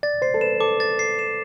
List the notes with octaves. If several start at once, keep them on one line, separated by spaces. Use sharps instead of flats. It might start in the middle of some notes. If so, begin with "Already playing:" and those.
D5 A6
C5 C7
A4
B4 E7
A4 D6
A6
C7
E7